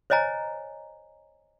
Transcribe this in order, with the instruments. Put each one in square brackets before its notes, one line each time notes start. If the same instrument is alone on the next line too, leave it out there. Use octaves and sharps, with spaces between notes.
[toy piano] C5 C#5 D#5 G#5 A#5